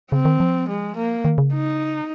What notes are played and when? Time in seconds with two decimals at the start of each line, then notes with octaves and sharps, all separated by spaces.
0.12 C#3 C4
0.25 D#3
0.40 F3
0.68 G#3
0.96 A#3
1.25 D#3
1.38 C#3
1.53 D#4